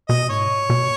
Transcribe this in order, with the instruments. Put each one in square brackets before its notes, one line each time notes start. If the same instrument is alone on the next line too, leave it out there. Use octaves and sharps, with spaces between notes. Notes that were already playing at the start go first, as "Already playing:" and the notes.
[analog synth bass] B2 [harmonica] D#5
[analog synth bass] G#2 [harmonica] C#5
[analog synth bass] B2